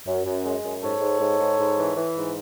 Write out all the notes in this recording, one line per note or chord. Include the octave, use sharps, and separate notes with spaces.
F#2
F#2
G#3
F#2
G#2 A4 C#5
G#2
G#2
G#2
G#2
E3
E3
G#2